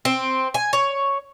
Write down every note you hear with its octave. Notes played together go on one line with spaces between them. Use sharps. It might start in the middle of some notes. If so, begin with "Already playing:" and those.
C4
G#5
C#5